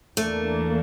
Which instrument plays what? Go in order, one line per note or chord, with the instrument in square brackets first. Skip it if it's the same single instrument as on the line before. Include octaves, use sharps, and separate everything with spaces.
[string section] E2 E3 A#3 D4 [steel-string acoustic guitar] A3